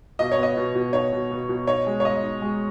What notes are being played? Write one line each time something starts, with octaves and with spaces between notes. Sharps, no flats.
B2 D#5
C#5
B3 D#5
B2
B2
D#4 C#5
B2
B2
B2
D#4 C#5
G#3
C#5
G#2 D#5
D#4
G#3